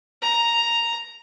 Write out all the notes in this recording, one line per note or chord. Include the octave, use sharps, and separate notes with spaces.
A#5